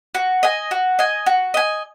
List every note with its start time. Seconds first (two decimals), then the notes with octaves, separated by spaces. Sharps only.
0.15 F#4
0.43 D#5 G#5
0.71 F#4
0.99 D#5 G#5
1.26 F#4
1.54 D#5 G#5